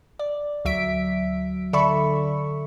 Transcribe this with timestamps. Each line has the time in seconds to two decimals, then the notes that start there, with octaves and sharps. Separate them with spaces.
0.19 D5
0.65 D2 F#3 E5 B6 D7
1.73 D3 A4 D5 E5 B5 C#6